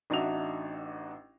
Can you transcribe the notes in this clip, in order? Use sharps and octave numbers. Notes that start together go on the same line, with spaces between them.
A1 D4 D#4 F#4 E5 F7